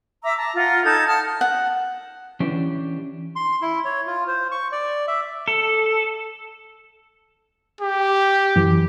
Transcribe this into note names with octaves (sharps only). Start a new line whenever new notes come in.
E5 A#5 D6 E6
A5 A#5
F4 F#5 A#5
D#4 A4 A5 G#6
F#5 A5 D#6 F6
F#5
E3 C#4 D4 G4 D5
C6
E4
C#5
F4
C5
C#6
D5
E5
A4
G4
F#2 E3